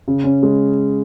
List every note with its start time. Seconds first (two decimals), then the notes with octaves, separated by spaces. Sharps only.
0.08 C#3
0.24 C#4
0.43 G#3